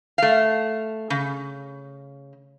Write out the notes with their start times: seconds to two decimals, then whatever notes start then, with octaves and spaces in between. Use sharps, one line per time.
0.18 A3 F5
1.10 C#3